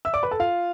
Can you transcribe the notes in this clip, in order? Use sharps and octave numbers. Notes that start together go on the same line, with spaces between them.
E5 E6
D5 D6
B4 B5
A4 A5
F4 F5